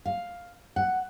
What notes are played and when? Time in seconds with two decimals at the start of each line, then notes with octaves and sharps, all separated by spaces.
0.05 F5
0.76 F#5